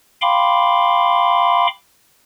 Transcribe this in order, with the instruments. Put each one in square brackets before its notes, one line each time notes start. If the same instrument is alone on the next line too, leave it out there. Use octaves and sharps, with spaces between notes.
[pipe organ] F5 G5 B5 C6 D6